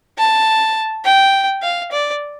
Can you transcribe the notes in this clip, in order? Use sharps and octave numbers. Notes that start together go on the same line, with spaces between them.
A5
G5
F5
D5